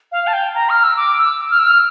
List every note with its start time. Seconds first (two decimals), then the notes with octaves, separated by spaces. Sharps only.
0.12 F5
0.27 A5
0.33 G5
0.55 A#5
0.70 F6
0.84 E6
0.97 D6
1.19 E6
1.51 F6
1.59 E6
1.66 F6